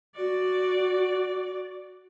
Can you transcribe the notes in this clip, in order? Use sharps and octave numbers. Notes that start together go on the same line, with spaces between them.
F#4 D5